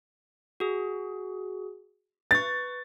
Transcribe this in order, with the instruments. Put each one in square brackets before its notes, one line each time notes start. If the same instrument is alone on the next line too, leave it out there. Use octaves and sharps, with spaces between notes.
[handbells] F#4 G#4
[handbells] B4 C#6 [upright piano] A6